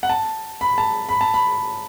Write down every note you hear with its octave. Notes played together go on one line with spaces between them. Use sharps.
F#5
A5
B5
A5
B5
A5
B5